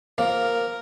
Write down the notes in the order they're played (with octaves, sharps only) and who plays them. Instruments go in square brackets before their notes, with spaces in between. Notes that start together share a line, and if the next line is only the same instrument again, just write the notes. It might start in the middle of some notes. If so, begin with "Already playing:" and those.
[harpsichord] F3 A#3 [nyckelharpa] A#4 [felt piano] F5